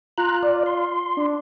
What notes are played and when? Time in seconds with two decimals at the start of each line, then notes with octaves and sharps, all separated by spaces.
0.18 F4 A#5 F#6
0.43 D5
0.66 C6
1.17 D4